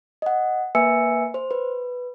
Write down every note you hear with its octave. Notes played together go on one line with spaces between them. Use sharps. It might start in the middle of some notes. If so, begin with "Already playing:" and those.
D#5 F#5
A#3 B4 E5 G#5 E6 C#7
C5
B4